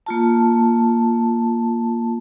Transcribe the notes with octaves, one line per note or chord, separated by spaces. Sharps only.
A#3 F4 A5